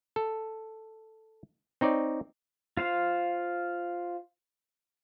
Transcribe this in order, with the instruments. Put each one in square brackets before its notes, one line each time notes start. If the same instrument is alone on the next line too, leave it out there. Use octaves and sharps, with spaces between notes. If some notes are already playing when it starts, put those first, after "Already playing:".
[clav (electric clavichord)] A4
C4 D#4 C#5 D5
[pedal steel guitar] F4 C5 F5